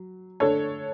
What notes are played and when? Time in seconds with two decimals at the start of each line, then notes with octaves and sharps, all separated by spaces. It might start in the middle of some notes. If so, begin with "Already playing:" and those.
Already playing: F#3
0.40 D3 A3 D4 A4 C#5